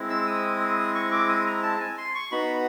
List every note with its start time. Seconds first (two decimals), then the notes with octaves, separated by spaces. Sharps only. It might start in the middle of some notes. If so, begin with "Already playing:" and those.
Already playing: G#3 C4 E4
0.10 E6
0.27 D#6
0.60 D#6
0.95 C#6
1.12 D6
1.28 D#6
1.46 A#5
1.63 A5
1.80 G#5
1.98 C6
2.15 C#6
2.31 B3 D#4 F#4 B5